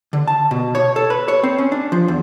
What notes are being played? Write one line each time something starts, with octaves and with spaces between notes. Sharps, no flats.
D3
A5
B2
C#5
A4
B4
C#5
C4
C#4
D4
F3
E2